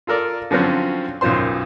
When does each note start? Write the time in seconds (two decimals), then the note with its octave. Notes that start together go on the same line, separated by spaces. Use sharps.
0.07 F4 A4 A#4 D5
0.51 D3 F3 F#3 C4 C#4
1.21 B1 F#2 D#3 F4 C5 C6